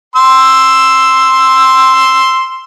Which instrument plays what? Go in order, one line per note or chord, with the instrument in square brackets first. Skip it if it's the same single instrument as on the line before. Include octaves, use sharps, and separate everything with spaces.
[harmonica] C6 E6